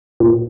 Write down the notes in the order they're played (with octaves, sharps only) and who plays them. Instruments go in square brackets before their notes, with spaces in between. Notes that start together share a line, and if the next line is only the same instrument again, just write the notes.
[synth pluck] A#2